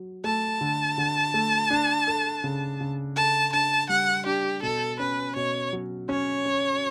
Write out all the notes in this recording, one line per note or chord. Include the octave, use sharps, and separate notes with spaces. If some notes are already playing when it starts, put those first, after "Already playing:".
Already playing: F#3
A3 A5
D3
D3
A3
D4
A4
C#3
C#3
A4 A5
D4 A5
G3 F#5
D4 G4
B2 A4
C#4 B4
B2 C#5
F#3
C#4 C#5
C#4